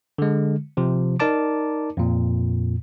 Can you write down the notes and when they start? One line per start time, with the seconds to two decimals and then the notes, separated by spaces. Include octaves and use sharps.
0.18 D3 G#3
0.77 C3 F3
1.20 D#4 A#4 D5 A5 D6
1.97 F2 A#2